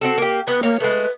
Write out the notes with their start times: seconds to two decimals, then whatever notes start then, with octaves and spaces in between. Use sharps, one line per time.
0.01 C4 F#4 A4
0.18 A#3 G4
0.48 B3 B4
0.63 A#3 C#5
0.80 G#3 A3 B4